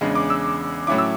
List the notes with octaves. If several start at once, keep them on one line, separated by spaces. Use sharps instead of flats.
E2 C#3 G#3 D4
D6
E6
A2 F#3 C#4 E4 D6
E6